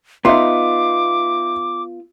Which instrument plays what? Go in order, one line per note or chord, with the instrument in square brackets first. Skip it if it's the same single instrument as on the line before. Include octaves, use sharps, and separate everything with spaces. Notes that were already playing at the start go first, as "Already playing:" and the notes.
[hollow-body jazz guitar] B3 F4 [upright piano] D#4 E5 C6 [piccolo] D6